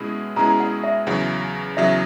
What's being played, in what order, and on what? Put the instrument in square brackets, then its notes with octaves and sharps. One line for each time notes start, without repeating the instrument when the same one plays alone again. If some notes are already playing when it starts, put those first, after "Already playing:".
Already playing: [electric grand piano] B2 G#3 C#4 E4 G#4
[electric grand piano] B2 G#3 C#4 E4 G#4 [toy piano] A#5
[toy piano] F#5
E5
[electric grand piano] E2 C#3 F#3 [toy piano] F#5
[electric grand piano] E2 C#3 F#3 [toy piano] E5